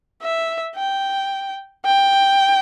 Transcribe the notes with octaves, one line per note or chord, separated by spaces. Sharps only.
E5
G5
G5